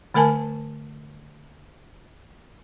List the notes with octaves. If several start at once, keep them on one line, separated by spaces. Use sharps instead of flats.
D3 A3 A#4 G#5 A5